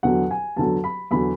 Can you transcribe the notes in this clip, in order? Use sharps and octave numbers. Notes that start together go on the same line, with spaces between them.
E2 D3 F#3 F#5
G#5
E2 D3 F#3 A5
B5
E2 D3 F#3 B5